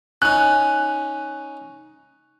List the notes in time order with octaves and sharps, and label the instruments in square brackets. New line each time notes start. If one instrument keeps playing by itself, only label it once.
[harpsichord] C#4 D#4 [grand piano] F#6